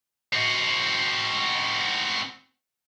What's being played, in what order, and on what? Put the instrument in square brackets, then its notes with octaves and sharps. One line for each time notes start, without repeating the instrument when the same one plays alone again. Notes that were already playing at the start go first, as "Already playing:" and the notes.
[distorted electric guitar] C4 F#4